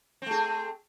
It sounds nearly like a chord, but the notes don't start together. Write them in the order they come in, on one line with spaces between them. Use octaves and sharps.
C4 A3 G#4